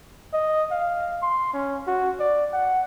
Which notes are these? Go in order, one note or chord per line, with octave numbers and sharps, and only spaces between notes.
D#5
F5
C6
C#4
F#4
D5
F#5